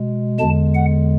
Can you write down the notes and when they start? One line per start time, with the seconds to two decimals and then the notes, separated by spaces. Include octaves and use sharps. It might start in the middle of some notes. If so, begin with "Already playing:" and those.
Already playing: B2 G#3
0.39 E2 D3 G#3 A5
0.75 F#5